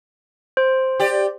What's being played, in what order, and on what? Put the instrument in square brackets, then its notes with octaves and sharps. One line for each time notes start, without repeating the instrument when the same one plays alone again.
[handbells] C5
[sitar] G4 D5